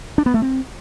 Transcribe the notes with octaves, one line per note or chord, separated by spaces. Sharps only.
D4
B3
A3
C4